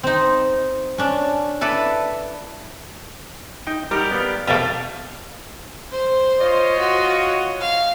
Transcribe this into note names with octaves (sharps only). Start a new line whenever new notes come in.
C4 D#4
C#4 D4 D5
E4 A4 B4 D5
D#4 G5
G3 D#4 G4 A#4 F#5
B3 D5 F5
F2 B2 A3 A#3 G#4
C5
F4 C#5 D#5
F#4
F5